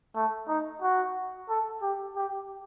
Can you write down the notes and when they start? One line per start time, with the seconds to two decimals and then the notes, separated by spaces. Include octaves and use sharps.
0.16 A3
0.48 D#4
0.82 F#4
1.49 A4
1.82 G4
2.16 G4